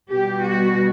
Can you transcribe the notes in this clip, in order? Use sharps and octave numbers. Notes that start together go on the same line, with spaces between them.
B2 G3 G4
F#4